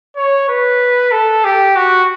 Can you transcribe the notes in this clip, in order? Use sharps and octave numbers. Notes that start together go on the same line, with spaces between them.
C#5
B4
A4
G4
F#4